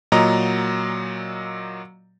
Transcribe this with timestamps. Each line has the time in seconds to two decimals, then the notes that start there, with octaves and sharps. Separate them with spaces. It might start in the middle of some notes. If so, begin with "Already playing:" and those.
0.12 A#2 F#3 D#5 A#5